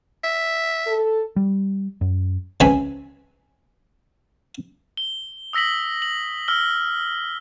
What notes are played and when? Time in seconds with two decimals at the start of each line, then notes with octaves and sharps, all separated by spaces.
0.24 E5
0.86 A4
1.36 G3
2.01 F#2
2.60 C#2 E3 C4 C#5 G#5 B5
4.97 G7
5.53 D#6 E6 A#6 B6 F#7
6.02 F#7
6.48 E6 F6 G7